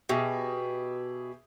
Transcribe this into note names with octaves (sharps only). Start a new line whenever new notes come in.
B2 G4 G#4 E5